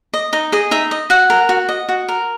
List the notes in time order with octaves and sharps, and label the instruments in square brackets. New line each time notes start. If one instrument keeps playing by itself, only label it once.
[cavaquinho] D#5
D#4 D#5
G#4 D#5
D#4 E5
D#5
F#4 F#5
A#4
F#4
D#5
F#4
A#4